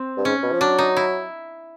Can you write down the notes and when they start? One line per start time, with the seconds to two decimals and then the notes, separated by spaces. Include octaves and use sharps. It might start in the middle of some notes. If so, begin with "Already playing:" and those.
Already playing: C4
0.17 G2
0.25 G#2 C#4
0.43 B2
0.52 F3
0.61 F#3 D4
0.78 D#4
0.96 E4